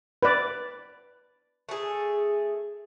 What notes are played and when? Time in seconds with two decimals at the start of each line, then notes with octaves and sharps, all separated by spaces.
0.23 B4 D5
1.69 A3 G#4